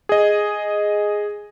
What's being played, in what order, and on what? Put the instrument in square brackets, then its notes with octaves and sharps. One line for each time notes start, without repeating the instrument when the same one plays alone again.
[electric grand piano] G#4 D#5